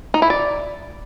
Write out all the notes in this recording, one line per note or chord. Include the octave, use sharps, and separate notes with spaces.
D#4
E4
D5